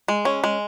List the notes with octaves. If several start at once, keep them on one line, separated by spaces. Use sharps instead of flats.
G#3
C#4
G#3